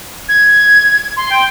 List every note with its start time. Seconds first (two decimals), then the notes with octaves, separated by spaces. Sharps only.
0.29 G#6
1.17 C6
1.30 G5